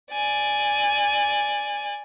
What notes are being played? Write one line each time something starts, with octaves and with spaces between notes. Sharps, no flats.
D5 G#5